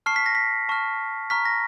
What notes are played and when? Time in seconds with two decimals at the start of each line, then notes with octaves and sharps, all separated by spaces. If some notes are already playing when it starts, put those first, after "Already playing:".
0.06 A5 C#6 F6 C7
0.16 B6
0.26 A#6
0.35 B6
0.69 A5 C#6 F6
1.30 A#5 C#6 F6 B6
1.45 A#6